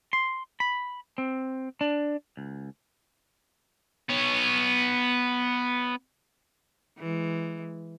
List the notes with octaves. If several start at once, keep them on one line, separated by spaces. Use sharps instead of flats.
C6
B5
C4
D4
C#2
B3 C#5
E3 G#3